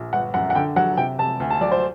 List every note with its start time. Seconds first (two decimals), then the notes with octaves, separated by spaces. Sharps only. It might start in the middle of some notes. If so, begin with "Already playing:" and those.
Already playing: A#1
0.13 G1 F#5
0.34 F#2 F#5
0.50 F#5
0.55 D3 G5
0.76 F#3 F#5
0.97 C3 G5
1.19 C3 A5
1.40 D2
1.50 A5
1.61 F#3 D5
1.72 C5